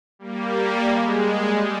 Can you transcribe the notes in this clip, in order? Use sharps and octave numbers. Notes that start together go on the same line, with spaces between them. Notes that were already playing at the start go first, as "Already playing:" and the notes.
G3 A#3
G#3
G3